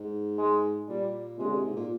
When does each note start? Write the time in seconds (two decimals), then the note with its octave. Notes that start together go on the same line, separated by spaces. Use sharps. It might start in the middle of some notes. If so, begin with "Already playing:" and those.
Already playing: G#2
0.38 G#3
0.88 A#2 G3
1.39 C3 G#3
1.45 D3
1.51 C3
1.63 G#2
1.76 A#2